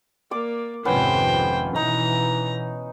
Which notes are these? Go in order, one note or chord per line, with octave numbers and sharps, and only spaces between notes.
A#3 D5 D6
G#1 F2 C3 B3 C#4 B4 C5 G5
B2 E3 D#4 A#5